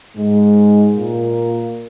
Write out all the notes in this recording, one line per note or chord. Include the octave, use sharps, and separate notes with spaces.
G#2 G#3
A#2 A#3